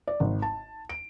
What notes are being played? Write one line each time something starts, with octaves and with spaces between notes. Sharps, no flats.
D5
G#1
A5
D7